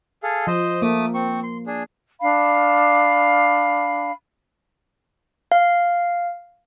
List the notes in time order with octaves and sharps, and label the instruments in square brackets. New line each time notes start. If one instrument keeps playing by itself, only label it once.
[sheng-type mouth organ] G#4 A4 F5
[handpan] F3 [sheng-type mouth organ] C5 D#5
[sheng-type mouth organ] A3 D6 D#6 [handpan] A#3
[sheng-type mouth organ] C4 C#6
C6
D4 G#4
[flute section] D4 F5 B5
[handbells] F5